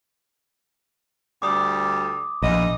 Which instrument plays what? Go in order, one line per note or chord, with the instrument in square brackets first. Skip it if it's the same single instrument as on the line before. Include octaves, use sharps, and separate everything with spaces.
[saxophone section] D2 G3 [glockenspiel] D6 D#6
[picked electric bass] A#1 [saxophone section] E2 D#4 D#5